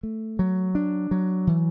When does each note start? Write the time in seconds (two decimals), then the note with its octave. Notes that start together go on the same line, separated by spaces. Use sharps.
0.03 A3
0.39 F#3
0.75 D4
1.11 F#3
1.47 E3